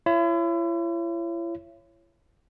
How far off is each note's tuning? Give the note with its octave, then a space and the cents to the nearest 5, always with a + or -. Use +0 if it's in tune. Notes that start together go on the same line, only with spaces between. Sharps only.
E4 +40 C#5 -5